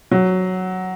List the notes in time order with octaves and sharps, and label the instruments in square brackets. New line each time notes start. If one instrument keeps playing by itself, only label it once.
[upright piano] F#3